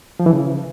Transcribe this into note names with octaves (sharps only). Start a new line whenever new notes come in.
F3
E3
C#3